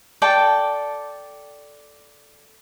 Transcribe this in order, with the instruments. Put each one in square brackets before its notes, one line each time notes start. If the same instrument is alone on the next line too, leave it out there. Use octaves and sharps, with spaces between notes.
[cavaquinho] A4 D5 G5 A5